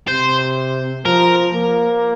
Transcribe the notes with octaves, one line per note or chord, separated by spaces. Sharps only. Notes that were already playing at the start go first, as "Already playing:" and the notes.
C3 C5
F3 A#4
A#3